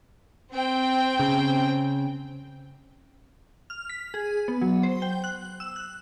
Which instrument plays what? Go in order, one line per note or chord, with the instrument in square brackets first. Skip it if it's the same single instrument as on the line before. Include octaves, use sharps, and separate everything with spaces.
[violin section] C4 G5
[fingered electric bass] C#3
[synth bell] F6
B6
G#4
B3
F#3
C5
G5
F#6
E6
F#6